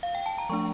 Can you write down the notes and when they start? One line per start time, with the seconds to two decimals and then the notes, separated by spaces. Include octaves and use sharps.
0.03 F5
0.15 G5
0.26 A5
0.38 A#5
0.49 F3 A3 D4 C#6